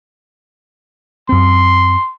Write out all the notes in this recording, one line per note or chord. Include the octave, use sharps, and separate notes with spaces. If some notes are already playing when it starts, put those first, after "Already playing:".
F#2 C4 C6